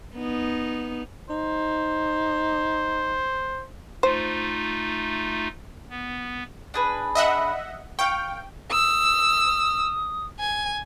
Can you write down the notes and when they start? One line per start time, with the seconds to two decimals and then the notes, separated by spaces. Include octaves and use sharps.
0.15 B3 D#4
1.30 D#4 C5
4.03 A3 D#4 F4 C5
5.90 B3
6.74 D4 G#4 B4
7.15 D#5 E5 F#5
7.99 F5 G5 C#6
8.72 D#6 E6
10.40 G#5